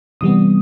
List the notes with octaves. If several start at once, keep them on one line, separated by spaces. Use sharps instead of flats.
C3 E3 G3 B3 D#6